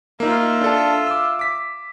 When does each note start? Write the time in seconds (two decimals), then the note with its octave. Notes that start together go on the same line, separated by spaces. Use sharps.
0.20 A#3 D#4 F4 E5
0.61 D4 A4
1.07 D6 E6
1.39 D6 B6